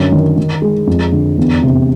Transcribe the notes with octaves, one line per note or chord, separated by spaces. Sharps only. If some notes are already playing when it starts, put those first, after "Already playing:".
Already playing: F#2 D3
D#3
D#3
G#3
F2
D3
E2
C3